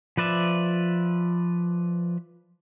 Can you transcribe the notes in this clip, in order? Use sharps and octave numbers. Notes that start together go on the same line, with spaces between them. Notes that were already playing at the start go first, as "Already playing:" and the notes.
F3 B4 D5 E5